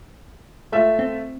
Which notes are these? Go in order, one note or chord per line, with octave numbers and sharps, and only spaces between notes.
A3 F4 E5
C4